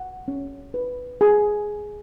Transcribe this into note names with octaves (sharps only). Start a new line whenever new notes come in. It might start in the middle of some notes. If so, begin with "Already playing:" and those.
Already playing: F#5
C#4
B4
G#4